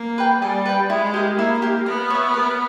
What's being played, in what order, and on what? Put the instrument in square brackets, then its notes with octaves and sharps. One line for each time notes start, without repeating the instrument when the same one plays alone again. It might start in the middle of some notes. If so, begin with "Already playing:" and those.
Already playing: [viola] A#3
[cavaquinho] B4 G5
[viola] G3 [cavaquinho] G#4
[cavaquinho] B4 G5
[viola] G#3 [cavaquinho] E4
[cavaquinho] G4 A#4
[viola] A#3 [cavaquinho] E4
[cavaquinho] G4 A#4
[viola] B3 [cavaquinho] A#4
[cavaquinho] C#5 E5
A#4